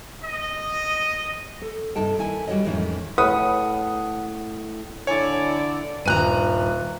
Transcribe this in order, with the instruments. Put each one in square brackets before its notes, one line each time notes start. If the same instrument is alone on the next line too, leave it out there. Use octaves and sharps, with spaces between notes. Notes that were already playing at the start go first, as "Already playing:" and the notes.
[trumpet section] D#5
[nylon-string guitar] A4
G2 C3 D#4 A4 G5
D#3 E4 G#5
G3 F#4 G4 C#5 D#5
F2 A2 D#3 E3 G#3 C#4
[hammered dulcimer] A2 [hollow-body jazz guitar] B4 [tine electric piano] F#5 [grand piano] D#6
[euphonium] D3 [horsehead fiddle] E4 D5 [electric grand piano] C#5 G#5
[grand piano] D#1 F#6 D#7 [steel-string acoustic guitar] G2 G#5 A#5